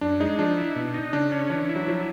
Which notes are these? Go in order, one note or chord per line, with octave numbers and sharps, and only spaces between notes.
F#2 D4
G#3 D#4
F3 D4
E4
B2
D#4
C#3 D4
C#4 D4
E3 D4
E4
F#3
F3 F#3